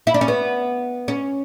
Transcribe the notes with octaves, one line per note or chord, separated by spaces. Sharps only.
E4
D4
C#4
B3
C#4